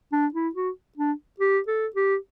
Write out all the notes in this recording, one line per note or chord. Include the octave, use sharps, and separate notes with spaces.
D4
E4
F#4
D4
G4
A4
G4